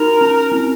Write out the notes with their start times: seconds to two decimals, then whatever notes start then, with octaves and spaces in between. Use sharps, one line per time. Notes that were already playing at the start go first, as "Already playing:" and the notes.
Already playing: D#4 F#4 A#4
0.21 C#4
0.52 C4